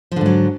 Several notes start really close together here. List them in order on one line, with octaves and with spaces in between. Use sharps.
F3 D3 G#2 F#3